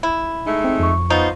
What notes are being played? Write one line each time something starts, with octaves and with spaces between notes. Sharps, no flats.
E4
G#3 A3 D#4
C4
F2 C#6
B3 D#4 F4 C5